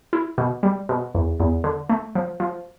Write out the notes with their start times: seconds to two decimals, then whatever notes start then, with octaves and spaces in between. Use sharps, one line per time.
0.13 E4
0.38 B2
0.63 G3
0.89 B2
1.15 E2
1.40 E2
1.64 D3
1.89 A3
2.15 F3
2.40 F3